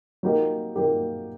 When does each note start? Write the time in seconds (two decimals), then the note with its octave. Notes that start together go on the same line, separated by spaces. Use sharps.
0.23 F#3 A#3 D#4 G4 A#4
0.75 F#3 A#3 D#4 G4 A#4